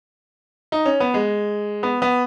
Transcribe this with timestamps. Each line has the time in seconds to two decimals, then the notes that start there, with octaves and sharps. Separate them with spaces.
0.72 D#4
0.86 C#4
1.00 B3
1.14 G#3
1.83 B3
2.02 B3